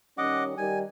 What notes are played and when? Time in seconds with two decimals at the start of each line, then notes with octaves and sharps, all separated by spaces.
0.18 D#3 G3 C#4 D#5 F#5 D6
0.58 D#3 G3 G#5